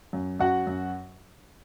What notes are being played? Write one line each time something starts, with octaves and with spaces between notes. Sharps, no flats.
F#2
F#2 F#4 F#5
F#2